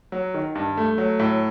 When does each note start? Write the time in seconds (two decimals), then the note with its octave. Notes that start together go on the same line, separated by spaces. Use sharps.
0.12 F#3
0.34 D#3
0.55 G2
0.77 A3
0.98 F#3
1.19 A2